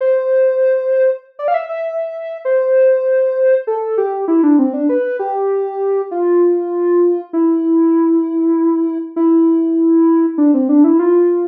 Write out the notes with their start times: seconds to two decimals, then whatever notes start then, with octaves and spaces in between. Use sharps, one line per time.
0.01 C5
1.39 D5
1.48 F5
1.54 E5
1.69 E5
2.45 C5
3.67 A4
3.98 G4
4.28 E4
4.43 D4
4.59 C4
4.74 D4
4.89 B4
5.19 G4
6.11 F4
7.33 E4
9.16 E4
10.38 D4
10.54 C4
10.69 D4
10.84 E4
10.99 F4